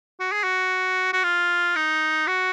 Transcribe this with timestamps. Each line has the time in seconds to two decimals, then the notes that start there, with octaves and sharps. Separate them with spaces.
0.20 F#4
0.32 G#4
0.43 F#4
1.13 F#4
1.23 F4
1.76 D#4
2.27 F#4